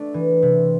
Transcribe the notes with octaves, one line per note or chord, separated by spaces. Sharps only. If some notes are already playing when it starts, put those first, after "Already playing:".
Already playing: A3 D4
E3
C3